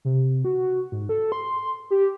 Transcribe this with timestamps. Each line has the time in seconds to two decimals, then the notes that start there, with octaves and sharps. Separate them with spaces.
0.05 C3
0.45 F#4
0.92 G#2
1.09 A4
1.32 C6
1.91 G4